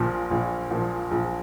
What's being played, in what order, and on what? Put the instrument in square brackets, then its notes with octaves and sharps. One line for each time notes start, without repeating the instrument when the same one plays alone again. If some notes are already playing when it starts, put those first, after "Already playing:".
Already playing: [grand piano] A#1 A#2 F3
A#1
A#2 F3
A#1